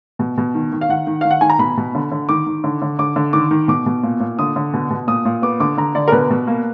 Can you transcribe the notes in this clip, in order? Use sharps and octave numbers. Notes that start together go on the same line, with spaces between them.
B2
B2
D#3
D#3
F5
D#3 F#5
D#3
D#3 F5
F#5
D#3 G#5
A#5
B2 B5
B2
D3
D3
D#3 D6
D#3
D3
D3
D3 D6
D3
D#3 D6
D#3
B2 D6
B2
A#2
A#2
D3 D#6
D3
B2
B2
A#2 D#6
A#2
B3 D6
D3 D6
D3 A#5
D3 D5
A#4
B2 B4
B2
A#3